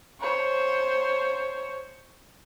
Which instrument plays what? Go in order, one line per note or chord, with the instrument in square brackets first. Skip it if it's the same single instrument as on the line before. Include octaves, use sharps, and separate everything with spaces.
[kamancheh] C5 C#5